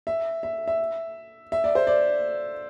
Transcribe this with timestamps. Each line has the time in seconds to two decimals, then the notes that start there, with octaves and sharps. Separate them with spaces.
0.07 E5
0.43 E5
0.68 E5
1.52 E5
1.64 D5
1.75 C5
1.87 D5